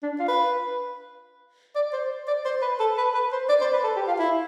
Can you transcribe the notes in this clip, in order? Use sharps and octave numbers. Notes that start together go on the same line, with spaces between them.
D4
F4
B4
D5
C5
D5
C5
B4
A4
B4
B4
C5
D5
C5
B4
A4
G4
F4
E4